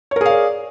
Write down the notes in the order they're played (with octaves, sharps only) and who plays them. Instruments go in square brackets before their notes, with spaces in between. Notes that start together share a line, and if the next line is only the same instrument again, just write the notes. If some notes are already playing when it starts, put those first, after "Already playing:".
[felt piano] C#5
A#4
G#4
F5
D5